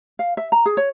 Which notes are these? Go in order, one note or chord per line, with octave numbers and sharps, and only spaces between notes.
F5
E5
A#5
G#4
C#5